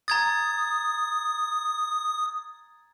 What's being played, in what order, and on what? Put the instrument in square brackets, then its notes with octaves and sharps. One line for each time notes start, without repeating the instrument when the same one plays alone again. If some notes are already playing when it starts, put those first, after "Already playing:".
[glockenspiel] A#5 G#6 A6 [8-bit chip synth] D#6